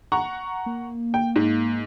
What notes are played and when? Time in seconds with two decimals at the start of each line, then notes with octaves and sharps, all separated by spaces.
0.12 F#5 A#5 C#6
0.66 A#3
1.14 G5
1.36 G#2